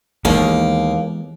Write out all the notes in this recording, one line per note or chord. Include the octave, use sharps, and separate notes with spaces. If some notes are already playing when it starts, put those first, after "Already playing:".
D#2 E3 G#3 A#3 B3